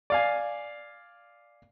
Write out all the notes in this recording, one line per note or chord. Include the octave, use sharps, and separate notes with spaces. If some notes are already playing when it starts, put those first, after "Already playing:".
D5 F5 G#5